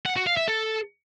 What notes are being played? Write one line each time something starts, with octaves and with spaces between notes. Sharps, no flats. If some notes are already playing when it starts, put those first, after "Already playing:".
F#5
F#4
F5
E5
A4